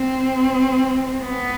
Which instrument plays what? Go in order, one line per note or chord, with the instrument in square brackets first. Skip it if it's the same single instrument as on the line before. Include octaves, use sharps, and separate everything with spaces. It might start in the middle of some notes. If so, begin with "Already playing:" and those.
Already playing: [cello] C4
B3